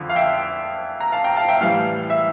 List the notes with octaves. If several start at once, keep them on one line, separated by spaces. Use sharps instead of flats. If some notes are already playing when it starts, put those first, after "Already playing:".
Already playing: F2 D3 F3
F5
E5 G5
A#5
F5 A5
G5 A#5
F5 A5
E5 G5
A2 E3 G3 F5
E5